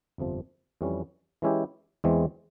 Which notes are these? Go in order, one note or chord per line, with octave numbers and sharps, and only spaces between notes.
G1 F2 C3 F3
F2 E3 G3 C#4
E3 G#3 C#4 E4 G4
E2 E3 G#3 C4